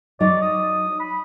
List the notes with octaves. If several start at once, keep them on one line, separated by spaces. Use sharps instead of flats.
F#3 D#4 D5 D#5
D#6
B5